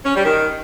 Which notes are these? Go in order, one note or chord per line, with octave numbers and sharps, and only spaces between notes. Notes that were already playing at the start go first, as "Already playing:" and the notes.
C#4
G3
D#3